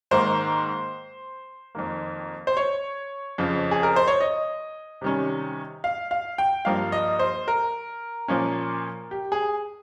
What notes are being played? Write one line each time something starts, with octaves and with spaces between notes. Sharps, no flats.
G#2 D#3 A#3 C5
F2 D#3 A#3
C5
C#5
F2 C#3 F3
G#4
A#4
C5
C#5
D#5
C3 D#3 G3 C#4
F5
F5
G5
G2 F3 A#3 F5
D#5
C5
A#4
A#2 F3 A#3 C#4
G4
G#4